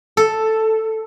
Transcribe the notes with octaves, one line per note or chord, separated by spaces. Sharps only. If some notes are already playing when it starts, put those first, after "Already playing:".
A4